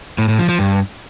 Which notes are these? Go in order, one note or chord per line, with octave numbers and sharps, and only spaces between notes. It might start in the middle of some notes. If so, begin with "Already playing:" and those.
A2
A2
F3
F3
G2